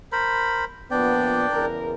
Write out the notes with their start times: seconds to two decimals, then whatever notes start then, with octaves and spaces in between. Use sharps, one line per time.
0.12 A#4 C5 B5
0.91 A#2 F3 B3 D4 D5 G5
1.50 E2 C#3 A#4